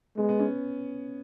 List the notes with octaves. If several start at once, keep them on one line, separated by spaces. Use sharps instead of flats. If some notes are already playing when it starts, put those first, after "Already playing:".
G#3 B3
B3
C#4